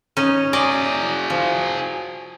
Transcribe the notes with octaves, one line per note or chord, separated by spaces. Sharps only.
C#4 D#4
F#4 G#4 D5 D#5
F3